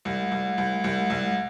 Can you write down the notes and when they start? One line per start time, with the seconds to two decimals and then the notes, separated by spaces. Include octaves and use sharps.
0.05 C2
0.31 C2
0.58 C2
0.84 C2
1.10 C2